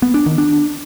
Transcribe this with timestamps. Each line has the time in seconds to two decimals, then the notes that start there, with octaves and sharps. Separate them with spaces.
0.02 B3
0.14 D4
0.26 D#3
0.38 D4